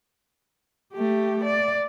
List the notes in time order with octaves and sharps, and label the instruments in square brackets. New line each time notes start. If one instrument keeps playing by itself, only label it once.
[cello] A3 G4
D5